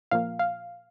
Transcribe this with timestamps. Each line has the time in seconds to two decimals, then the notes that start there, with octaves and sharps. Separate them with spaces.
0.11 A#2 F3 A#3 F5
0.39 F5